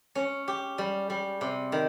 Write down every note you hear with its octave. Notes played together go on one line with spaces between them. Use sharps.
C#4
G4
G3
G3
C3
D#3